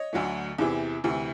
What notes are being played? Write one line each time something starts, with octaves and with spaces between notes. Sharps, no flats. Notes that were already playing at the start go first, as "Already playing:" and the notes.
Already playing: C#5 D#5
D2 D3 F#3 A3
E2 C3 E3
D2 C3 E3